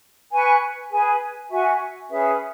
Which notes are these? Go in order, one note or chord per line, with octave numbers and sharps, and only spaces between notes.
B4 G#5 C#6
G#4 B4 G#5
F#4 E5 G#5 C#6
C#4 G#4 B4 E5